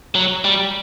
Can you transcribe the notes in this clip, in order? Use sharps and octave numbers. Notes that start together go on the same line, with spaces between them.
F#3
G3